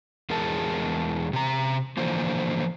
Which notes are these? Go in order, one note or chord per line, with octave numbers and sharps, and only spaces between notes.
E2 G#3 G#4 A#4 A5
C3 A#5
D3 E3 F3 A#3 C5